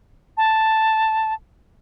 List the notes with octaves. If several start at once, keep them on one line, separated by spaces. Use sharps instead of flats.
A5